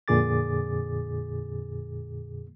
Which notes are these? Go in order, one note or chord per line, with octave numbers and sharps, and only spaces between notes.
F2 A#2 D3 G#4 D6 A6